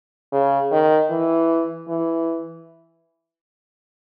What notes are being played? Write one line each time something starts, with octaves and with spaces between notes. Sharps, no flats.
C#3
D#3
E3
E3